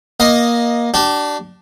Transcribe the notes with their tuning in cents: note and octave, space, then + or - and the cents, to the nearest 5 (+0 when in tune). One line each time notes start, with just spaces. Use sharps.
A#3 +20 D#5 +0
D4 +0 G4 -45